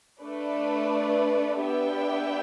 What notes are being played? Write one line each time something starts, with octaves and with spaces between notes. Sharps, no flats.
A3 D4 B4 D5
B3 D4 G4 E5 G5